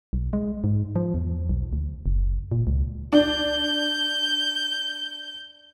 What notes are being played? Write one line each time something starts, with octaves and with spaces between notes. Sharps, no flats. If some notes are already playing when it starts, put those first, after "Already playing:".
B1
G#3
G#2
F3
E2
B1
D2
F#1
A#2
C#2
D4 G6